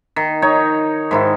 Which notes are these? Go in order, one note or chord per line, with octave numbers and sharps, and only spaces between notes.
D#3
D#4 C#5
G#2 D#3 E4